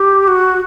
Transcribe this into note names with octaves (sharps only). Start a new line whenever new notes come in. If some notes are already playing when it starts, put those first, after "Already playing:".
Already playing: G4
F#4